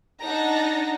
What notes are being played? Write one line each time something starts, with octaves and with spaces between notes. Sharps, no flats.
D4 D#4 F#5 A5 A#5 A#6